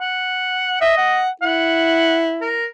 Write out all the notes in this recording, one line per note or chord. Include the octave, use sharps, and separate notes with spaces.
F#5
D#5 E5
F#5
E4 F#5
A#4